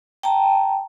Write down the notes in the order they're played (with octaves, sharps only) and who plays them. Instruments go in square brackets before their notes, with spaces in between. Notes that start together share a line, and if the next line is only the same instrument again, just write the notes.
[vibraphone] G5 A5 A#5